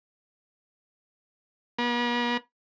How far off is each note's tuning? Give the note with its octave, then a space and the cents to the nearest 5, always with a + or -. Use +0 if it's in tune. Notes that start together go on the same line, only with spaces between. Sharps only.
B3 -45